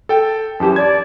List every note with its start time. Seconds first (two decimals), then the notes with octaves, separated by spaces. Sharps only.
0.09 A4 G5
0.60 F#2 E3 G4 A5
0.76 D5 G#6